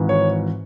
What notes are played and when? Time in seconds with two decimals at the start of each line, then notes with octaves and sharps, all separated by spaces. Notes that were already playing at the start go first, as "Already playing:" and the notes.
Already playing: G#1 G#2 E3
0.09 C#5